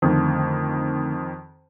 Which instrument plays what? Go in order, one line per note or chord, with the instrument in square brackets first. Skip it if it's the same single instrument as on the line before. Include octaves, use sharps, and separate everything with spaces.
[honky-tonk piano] F2 D#3 [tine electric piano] D3 A3